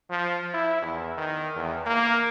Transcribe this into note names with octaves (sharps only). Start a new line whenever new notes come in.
F3
E4
E2
D#3
E2
A#3